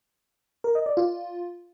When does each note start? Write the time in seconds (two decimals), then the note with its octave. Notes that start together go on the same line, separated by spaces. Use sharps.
0.64 A#4
0.75 D#5
0.86 D5
0.97 F4